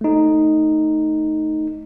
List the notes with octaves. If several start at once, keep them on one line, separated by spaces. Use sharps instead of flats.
A3 D#4